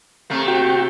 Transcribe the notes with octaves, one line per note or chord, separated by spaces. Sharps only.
C3 A3 A#3
F#4 G5